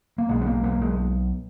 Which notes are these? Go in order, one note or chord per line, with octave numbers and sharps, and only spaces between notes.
A#3
B1 G#3
B3
A#3
B1 A#3
G#3